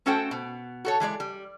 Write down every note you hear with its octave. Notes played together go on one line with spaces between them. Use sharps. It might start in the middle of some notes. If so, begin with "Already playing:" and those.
A3 C#4 F#4 A4 C5 G5
B2
F#4 A4 C#5
E3 G#3 G#4 D5
G3